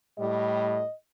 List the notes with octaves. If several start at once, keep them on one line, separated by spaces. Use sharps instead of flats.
A2 G3 D#5